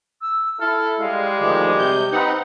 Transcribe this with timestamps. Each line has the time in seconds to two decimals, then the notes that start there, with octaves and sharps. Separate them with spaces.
0.22 E6
0.60 E4 A4 F6
1.00 G3 G#3 F5
1.40 D2 D#3 F3 D6
1.79 C3 G6
2.12 C4 D#4 B4 F#5